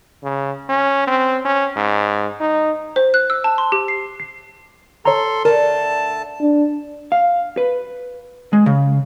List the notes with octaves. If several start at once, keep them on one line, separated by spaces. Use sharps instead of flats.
C#3
C#4
C4
C#4
G#2
D#4
C5
F#6
E6
A5
C6
G4
C7
C7
A4 C#5 A#5 C6
D3 A3 A#4 A5
D4
F5
B4
G#3
C#3